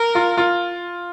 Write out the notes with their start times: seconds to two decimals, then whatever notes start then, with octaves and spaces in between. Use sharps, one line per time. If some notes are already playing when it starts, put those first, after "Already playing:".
Already playing: A#4
0.15 F4
0.37 F4